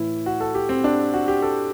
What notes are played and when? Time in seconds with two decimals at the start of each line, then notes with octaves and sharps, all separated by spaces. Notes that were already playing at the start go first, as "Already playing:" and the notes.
Already playing: A2 E3 E4
0.26 F#4
0.40 A4
0.55 G4
0.69 C4
0.84 D4
1.14 F#4
1.28 G4
1.42 A4